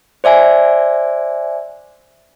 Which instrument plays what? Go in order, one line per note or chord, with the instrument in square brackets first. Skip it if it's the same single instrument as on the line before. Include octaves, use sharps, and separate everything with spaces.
[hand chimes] C5 D5 E5 G#5